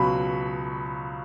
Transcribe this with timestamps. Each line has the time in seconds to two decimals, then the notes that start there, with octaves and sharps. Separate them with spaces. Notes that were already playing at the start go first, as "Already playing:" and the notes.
Already playing: C#2 B2 F#3 B5